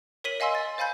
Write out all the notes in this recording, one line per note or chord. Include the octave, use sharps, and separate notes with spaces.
A#4 C#5 B6 D#7 F#7 G7
D#5 F5 G#5 C6 E6
A6
C5 F5 G#5 B5 G6